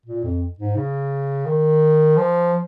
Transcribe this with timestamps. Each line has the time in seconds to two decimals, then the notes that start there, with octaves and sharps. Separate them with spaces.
0.06 A#2
0.24 F2
0.59 G#2
0.76 C#3
1.46 D#3
2.17 F3